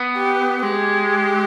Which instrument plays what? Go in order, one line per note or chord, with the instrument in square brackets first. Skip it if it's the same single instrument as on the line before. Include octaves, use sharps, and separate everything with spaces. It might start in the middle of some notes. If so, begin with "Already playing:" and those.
Already playing: [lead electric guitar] B3
[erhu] G4
[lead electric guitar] G#3 [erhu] G4